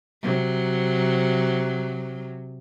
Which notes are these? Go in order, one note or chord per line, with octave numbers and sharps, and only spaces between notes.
C3 F#3